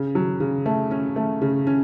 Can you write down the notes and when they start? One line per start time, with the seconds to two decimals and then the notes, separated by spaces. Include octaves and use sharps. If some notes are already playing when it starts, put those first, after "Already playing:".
Already playing: C#3
0.15 F#3
0.40 C#3
0.66 A3
0.91 C#4
1.16 A3
1.42 C#3
1.67 C#4